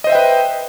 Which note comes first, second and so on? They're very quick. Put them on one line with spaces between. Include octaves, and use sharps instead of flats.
D#5 C5 E5 G5 B4